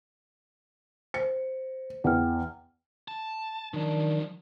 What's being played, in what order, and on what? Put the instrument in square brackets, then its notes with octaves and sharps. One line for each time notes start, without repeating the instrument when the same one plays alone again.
[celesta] C5 [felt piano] C#7
[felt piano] E2 [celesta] F#5 G5 F6
[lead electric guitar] A5
[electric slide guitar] D#3 D4 [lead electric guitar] F3 F#3